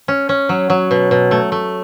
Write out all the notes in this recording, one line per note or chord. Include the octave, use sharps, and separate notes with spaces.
C#4
C#4
F#3
F#3
B2
B2
A3
A3